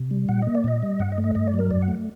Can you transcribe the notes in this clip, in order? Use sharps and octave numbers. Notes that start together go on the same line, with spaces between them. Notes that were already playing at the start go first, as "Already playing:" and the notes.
Already playing: C3
G3
A#2 F#5
A#3 D#5
D5
A#2 D#5
G3
G2 F#5
D#5
A3
D#5
G2 D#5
D5
F#3
A#4
F#2 D5
F#5
A3